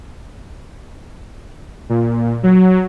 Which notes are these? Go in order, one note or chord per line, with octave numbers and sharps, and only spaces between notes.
A#2
F#3